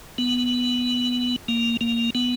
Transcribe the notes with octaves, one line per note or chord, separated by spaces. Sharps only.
B3
A#3
A#3
B3